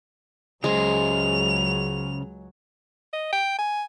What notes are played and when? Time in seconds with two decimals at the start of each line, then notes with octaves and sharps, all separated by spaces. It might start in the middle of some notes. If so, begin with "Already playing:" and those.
0.64 C#2 C#3 F#3 G#3 C5 F7
3.13 D#5
3.32 G5
3.59 G#5